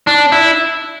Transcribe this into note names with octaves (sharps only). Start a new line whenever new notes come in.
D4
E4